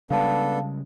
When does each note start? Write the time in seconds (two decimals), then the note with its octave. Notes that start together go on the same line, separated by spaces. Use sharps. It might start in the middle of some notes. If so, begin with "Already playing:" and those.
0.10 C#3 G3 G#3 B3 D4 A4 F5 A5